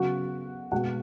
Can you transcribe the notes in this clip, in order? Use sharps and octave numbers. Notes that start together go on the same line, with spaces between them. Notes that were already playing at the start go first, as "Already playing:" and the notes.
Already playing: C#3 F#3 B3 F#4 F#5
B2 G#3 B3 F#4 F#5